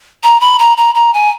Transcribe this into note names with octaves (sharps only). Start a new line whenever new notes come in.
A#5
B5
A#5
A#5
A#5
G#5